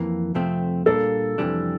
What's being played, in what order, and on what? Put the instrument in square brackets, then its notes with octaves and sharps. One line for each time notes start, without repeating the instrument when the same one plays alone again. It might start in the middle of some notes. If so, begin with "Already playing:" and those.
Already playing: [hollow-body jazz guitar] F2 E3 A#3
F2 C3 F3 A3 C4
[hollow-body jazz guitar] A#2 G3 A#3 D4 [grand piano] A4
[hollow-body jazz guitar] F2 C3 E3 G3 D4